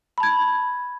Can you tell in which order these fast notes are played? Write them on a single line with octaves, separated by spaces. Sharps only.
B5 A5 G#6